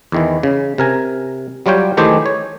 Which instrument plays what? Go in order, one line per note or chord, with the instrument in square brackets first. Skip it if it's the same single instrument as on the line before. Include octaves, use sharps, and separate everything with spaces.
[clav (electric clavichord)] E2 D#3 E3
C#3
C3 A#4 G#5
F#3 G3 F4 C#5 G5
D#3 E3 A3 G4 G#4 C5
C#5